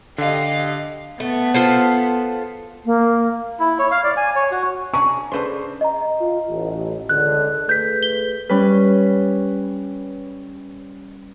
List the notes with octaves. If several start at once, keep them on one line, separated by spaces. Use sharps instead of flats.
D3 G4 D#5 F5
A3 B3
F4 A4 C5
A#3
E4
C#5
F5
D5
G#5
C#5
F#4
C#4 D4 G#4 A#5 C#6
C#3 D4 A4 B4 C5 C6
D#5 A#5
F4
A1
C#2 D3 F#6
A3 G#4 B4 G6 B6
G7
G3 C#4 B4